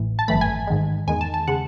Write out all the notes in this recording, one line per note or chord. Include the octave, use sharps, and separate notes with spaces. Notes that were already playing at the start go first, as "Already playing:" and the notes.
Already playing: A1 A2 E3
A5
G#1 F#2 E3 A3 B5
G#5
G#2 D#3 G#3
E2 D#3 G#3 G#5
A5
A5
C#3 G#3 F#5